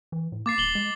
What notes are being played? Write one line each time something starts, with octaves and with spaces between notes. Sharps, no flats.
E3
A2
A#3 D6 A6 C7
D#1 F#7 G7
G#3